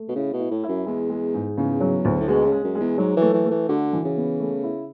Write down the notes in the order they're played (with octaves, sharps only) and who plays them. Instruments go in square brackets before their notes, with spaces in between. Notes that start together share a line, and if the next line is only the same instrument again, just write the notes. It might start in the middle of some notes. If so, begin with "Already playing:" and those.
Already playing: [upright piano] A3
[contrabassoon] B2
[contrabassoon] C#3 [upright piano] E4
[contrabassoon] B2
[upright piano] E4
[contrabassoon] A2
[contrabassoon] F#2 [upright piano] E4
[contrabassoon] E2 [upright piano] G#3
[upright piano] G#3
G#2
[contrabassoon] E2 [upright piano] C#3
[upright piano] F#3
D2
[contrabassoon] A2
[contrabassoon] B2 [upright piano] G#3
[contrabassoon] C#3
[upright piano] G#3
[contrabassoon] F#2
[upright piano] G#3
[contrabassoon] E2
[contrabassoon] G#2 [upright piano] F#3
[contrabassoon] E3 [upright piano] A3
[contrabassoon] E3
[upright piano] A3
[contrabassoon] E3
[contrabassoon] D3 [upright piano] F#4
[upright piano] E3
[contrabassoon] C#3
[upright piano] B3
A3
E4